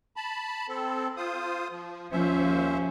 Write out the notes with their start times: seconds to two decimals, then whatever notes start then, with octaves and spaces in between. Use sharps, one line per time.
0.16 A5 B5
0.68 C4 A4
1.17 F4 C5 D#6
1.71 F3
2.12 D#2 F3 C#4 C5 E5